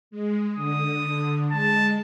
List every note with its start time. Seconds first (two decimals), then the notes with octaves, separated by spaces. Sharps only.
0.11 G#3
0.56 D3 D#6
1.51 G#3 A5